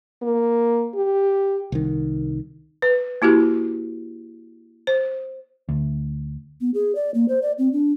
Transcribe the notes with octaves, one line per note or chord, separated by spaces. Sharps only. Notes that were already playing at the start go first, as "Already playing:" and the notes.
A#3
G4
C2 D#3
B4
A#3 E4 F#4 G4
C5
D2
B3
G#4
D5
A#3
C5
D5
C4
D4